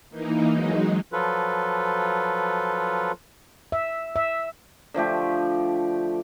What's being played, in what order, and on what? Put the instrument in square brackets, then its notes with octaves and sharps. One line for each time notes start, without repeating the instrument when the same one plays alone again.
[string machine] E3 A#3 D#4
F#3 G#3 D#4
[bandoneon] F3 F#3 F4 A4 B4
[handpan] E5
E5
[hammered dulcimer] D3 F3 A3 G4